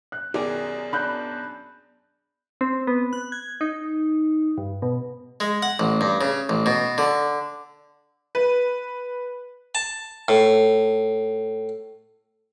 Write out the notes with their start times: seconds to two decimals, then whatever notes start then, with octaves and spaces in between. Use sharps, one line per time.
0.12 F#6
0.34 F#2 B2 D#3 G4 G#4 D5 G#5
0.93 D4 B5 F#6 G6
2.61 C4
2.87 B3
3.13 F#6
3.32 G#6
3.61 D#4
4.58 G2
4.82 B2
5.40 G#3
5.62 F#5
5.79 A1
6.01 G2
6.21 C#3
6.49 A1
6.66 B2
6.98 D3
8.35 B4
9.75 A5
10.28 A2